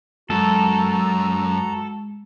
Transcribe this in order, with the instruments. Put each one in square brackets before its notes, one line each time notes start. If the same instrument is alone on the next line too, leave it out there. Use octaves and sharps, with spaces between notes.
[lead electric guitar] F#2 [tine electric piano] G#3 [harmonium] F#4 A#5 [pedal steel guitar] A4